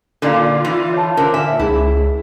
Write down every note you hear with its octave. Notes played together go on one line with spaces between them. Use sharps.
A#2 D3 F4 A4 D5 F5
E3
C#5 A5
D3 A#4 C5
A#2 E5 G5 G#5
C#2 C#4 E4 G#4